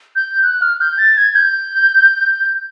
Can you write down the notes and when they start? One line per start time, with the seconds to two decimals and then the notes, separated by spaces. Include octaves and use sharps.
0.16 G6
0.43 F#6
0.62 F6
0.81 G6
0.98 A6
1.18 G#6
1.35 G6